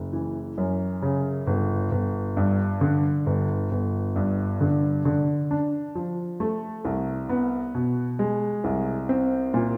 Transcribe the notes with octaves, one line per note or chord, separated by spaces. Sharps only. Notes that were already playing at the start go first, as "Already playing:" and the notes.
Already playing: F#1
E3
F#2
C#3
G1
G1
G2
D3
G1
G1
G2
D3
D3
D4
F3
A3
C2
B3
B2
G#3
C2
C4
A#2